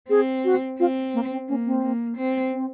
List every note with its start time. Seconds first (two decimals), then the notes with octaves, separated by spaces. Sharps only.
0.09 C4 G#4
0.45 F#4
0.79 C4 F4
1.14 A#3
1.31 C4
1.48 A#3 C#4
1.66 C4
1.83 A#3
2.17 C4
2.53 C4